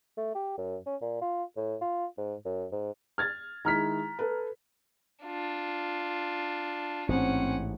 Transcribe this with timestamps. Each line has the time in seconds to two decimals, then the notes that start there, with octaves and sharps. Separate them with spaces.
0.17 A3
0.35 G4
0.58 F#2
0.86 C#4
1.02 A#2
1.21 F4
1.57 A2
1.81 F4
2.18 G#2
2.45 F#2
2.72 G#2
3.18 F6 G#6 A6
3.65 D#3 G#3 E4 A#5 F6 B6
4.19 A4 B4
5.24 D4 F4
7.09 A1 G#2 C4 C#4 F#5